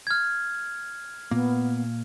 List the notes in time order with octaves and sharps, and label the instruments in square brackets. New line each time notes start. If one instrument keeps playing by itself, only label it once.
[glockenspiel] F6 G#6
[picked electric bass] A#2 A#3 [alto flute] B3